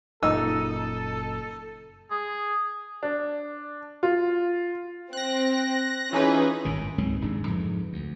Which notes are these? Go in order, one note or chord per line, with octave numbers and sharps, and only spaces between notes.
F#1 F#2 A#2 D#4 A4 E6
G#4
D4
F4
C4 F#6 A#6
E3 C#4 D#4 F4 G#4 B4
G#1 G2 D#3
C#2 G#2 F#3 C4
D#1 G#2 C#3 D4
F2 G#2 C#3 E3
D2